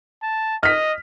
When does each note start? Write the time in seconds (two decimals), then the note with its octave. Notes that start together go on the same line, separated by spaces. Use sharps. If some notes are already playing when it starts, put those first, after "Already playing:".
0.23 A5
0.63 D#5 F6 B6